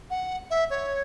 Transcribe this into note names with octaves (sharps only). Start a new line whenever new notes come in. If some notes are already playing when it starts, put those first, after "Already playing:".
F#5
E5
C#5